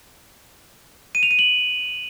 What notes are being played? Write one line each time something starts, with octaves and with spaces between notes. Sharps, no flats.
D#7
F7
D#7
F#7